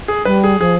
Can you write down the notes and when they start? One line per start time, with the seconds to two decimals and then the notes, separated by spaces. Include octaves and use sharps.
0.08 G#4
0.25 G3 B4
0.44 G#4
0.60 F3 G#4